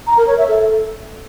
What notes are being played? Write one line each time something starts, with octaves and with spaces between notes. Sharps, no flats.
A#5
A#4
C#5
E5
A4